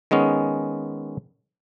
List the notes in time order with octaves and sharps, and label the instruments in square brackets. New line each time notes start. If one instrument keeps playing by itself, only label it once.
[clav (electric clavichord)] D#3 G#3 B3 C#4